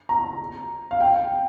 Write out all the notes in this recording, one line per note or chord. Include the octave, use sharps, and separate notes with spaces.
A#5
F5
G5